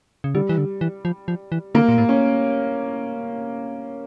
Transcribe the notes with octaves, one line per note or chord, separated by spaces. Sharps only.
C#3
D3 G3
E3
D3
E3
F3
F3
E3
D3 A#3
A#2
A2
C#4